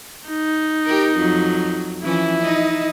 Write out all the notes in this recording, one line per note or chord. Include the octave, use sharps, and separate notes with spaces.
D#4
G4 A#4
F2 F#3
E3 F3 C#4 E4
D#4 D#5